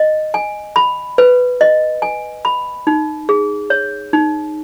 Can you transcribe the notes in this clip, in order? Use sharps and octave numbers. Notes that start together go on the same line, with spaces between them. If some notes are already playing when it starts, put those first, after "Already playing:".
Already playing: D#5
G#5
B5
B4
D#5
G#5
B5
D#4
G#4
C#5
D#4